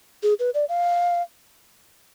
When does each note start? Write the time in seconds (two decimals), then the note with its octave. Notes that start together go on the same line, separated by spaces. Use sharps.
0.23 G#4
0.39 B4
0.54 D5
0.69 F5